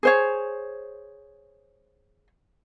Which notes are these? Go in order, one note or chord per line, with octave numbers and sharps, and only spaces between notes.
G#4 C5 C#5